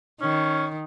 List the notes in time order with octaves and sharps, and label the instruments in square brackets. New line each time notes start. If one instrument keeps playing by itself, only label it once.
[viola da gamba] D#3 [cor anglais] C#4